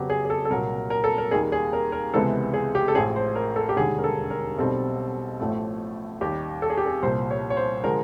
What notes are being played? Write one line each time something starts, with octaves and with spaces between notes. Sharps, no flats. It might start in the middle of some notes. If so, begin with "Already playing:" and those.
Already playing: F2 C#3 F#3 B3 G4
G#4
G#4
A4
A4
C2 A#2 F#3 A#3 A#4
A#4
A4
A#4
D#2 D#3 G3 A#3 G#4
G#4
A#4
A#4
C#2 C3 E3 G#3 B3 A4
G#4
G4
A4
A1 A2 F3 G#4
C5
A#4
A4
G4
E1 D#2 D3 G3 G#4
A#4
A4
A#4
B1 B2 G3 C4 A4
A1 A2 F3 A3
D#2 D#3 G3 G4
A4
G#4
G4
G#4
C2 A#2 F3 C5
C#5
C#5
C5
D3 F3 G#3 A#4